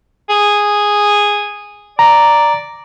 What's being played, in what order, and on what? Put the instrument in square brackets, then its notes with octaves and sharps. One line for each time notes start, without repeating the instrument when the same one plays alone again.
[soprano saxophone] G#4
[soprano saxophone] D5 [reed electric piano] A#5